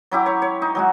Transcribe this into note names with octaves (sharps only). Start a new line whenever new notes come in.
F#3 E4 G4 D6
C#5 C6
C#5
D#4
F#3 G#3 F#4